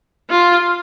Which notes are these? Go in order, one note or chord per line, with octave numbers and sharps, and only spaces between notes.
F4